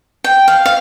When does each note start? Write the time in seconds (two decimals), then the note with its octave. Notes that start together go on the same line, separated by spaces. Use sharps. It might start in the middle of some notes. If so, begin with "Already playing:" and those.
0.24 G5
0.48 F5
0.66 F5